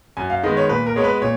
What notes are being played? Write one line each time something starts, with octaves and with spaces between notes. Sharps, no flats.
F#2 G#5
F5
D#3 G#3 B3 D#5
C#5
A#2 B4
A#4
G#3 B3 C#5
B4
A#2 C#5